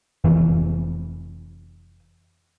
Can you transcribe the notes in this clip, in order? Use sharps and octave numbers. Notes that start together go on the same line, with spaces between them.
F1 F2 E3